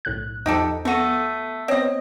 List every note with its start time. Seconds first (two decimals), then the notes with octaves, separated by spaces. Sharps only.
0.05 B1 A2 F#6
0.46 E2 F3 D#4 G4 A4
0.85 A3 B3 F#4 A4 D#7
1.68 B3 C4 C#5 D#5